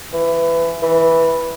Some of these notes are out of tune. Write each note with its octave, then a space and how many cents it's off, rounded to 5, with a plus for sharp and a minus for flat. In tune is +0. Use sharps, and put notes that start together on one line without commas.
E3 +20
E3 -5